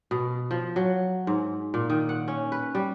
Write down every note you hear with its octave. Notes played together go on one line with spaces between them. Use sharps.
B2
F3
F#3
G#2
A#2
D#3
F#5
C#4
B4
G3